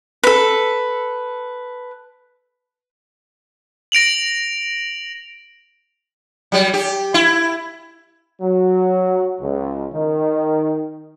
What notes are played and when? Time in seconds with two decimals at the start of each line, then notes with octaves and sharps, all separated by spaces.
0.23 A4 B4
3.92 A#6 D7 F7 F#7
6.52 F#3 G3
6.74 G4
7.14 E4
8.41 F#3
9.40 C#2
9.94 D#3